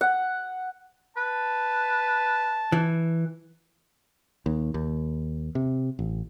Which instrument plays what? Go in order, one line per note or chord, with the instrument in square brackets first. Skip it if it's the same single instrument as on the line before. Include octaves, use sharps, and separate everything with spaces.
[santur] F#5
[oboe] B4 [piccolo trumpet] A5
[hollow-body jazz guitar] E3
[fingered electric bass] D#2
D#2
C3
A1